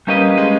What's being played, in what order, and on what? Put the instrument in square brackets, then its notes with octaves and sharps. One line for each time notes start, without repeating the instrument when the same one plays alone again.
[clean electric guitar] G3 C#4 G4 B4 D#5 [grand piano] A#3
[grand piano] G#3